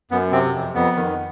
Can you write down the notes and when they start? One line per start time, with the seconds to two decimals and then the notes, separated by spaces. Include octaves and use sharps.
0.11 F#2 B3
0.32 C3 C4
0.54 F2
0.75 F2 B3
0.96 D#3